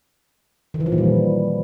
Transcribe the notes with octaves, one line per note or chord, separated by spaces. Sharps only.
D#3
E3
F3
A#2
G3